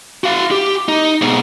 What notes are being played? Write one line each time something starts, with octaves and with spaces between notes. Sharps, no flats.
F#4 F5
G4
D#4
G#2 B2